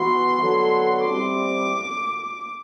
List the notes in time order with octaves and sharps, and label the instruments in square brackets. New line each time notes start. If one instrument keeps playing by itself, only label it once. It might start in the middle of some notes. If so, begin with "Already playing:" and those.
Already playing: [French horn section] E3 B3 F#4 [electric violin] C6
[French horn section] D3 F#3 B3 F#4 A4
[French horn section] G3 C4 E4 [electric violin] D6